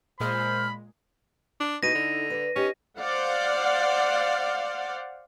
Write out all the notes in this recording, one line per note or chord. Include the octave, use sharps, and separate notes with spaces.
A#2 G#3 C5 B5 F6
D4
B2 D#4 E4 A4 A#6 D#7
D3
B4 D5
C#4 D#4 G4
C5 D5 F5 F#5